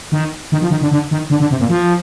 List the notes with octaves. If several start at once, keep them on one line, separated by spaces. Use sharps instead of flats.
D#3
D#3
F3
D#3
D3
D3
D#3
D3
D3
C3
A#2
F3